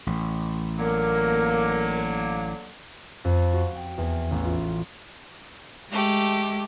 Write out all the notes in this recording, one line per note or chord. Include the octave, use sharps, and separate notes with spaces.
A1
D3 F#3 A#3 A#4
F2
F#4
G5
E2
A1
F4
G#3 A3 G4